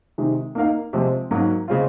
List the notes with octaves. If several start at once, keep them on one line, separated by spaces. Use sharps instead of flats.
C3 D#3 G#3
A#3 D#4 A#4 F5
C3 F3 G#3 C4
G#2 F#3 A#3
C#3 G#3 C4 F4